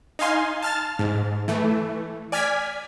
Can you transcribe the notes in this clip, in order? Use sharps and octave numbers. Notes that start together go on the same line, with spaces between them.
D#4 F5 G#5 C6
A5 F6 A6
G#2
E3 A3
D5 G#5 F6 G#6 B6